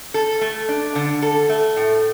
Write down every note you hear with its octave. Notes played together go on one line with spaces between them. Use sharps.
A4
A3
D4
D3
A4
A3
A2